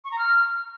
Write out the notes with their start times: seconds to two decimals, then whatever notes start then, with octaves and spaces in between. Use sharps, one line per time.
0.05 C#6
0.12 A#5
0.18 F6